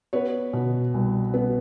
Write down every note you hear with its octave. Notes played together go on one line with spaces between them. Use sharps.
B3 B4 C#5
B2
C2
B3